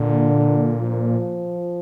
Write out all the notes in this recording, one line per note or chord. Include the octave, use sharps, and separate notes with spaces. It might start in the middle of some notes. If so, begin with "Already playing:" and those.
Already playing: A#2 D3
F3